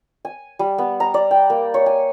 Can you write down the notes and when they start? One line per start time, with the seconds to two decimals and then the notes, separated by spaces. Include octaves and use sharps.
0.25 G#5
0.59 G3
0.78 B3
1.00 A#5
1.14 D5
1.31 G5
1.50 A#3
1.74 C#5
1.86 G#5